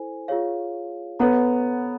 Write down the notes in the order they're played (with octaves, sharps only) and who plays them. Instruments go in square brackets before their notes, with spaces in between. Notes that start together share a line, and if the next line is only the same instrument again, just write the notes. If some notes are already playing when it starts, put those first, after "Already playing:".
Already playing: [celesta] E4 A4 C5 G#5
F4 G#4 C#5 F5
[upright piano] B3 [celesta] A4 C#5 F#5 A#5